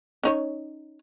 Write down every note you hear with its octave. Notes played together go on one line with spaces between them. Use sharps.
C#4 D#4 C#5